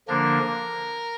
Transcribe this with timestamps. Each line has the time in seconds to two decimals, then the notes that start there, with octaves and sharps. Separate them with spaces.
0.08 D3 F3 A#3 D4 A#4